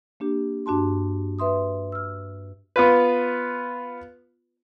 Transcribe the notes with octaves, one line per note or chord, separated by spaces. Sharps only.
A#3 D4 G4
G2 D4 F#4 A5 C6
B4 E5 C6 D#6
E6 F6
B3 F4 B4